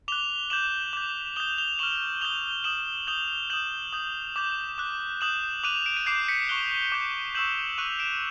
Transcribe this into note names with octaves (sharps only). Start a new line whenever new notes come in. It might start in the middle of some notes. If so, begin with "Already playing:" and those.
D6 F#6 F7 G7
D6 G6 E7 F#7
D6 G6
D#6 G6 F7 G7
F7 G7
C#6 F6 E7 F#7
D#6 G6 F7 G7
D#6 G6 E7 F#7
D#6 G6 F7 G7
D#6 G6 E7 F#7
D#6 G6
D6 G6
D6 F#6
D#6 G6 E7 F#7
D6 F#6 D#7 F7
D7 E7
D#7
D6 G6 C7 D7
B6 C#7
C#6 F#6 F7 G7
D6 G6
C#6 E6 G6 E7 F#7
C#6 F#6 D#7 F7
D7 E7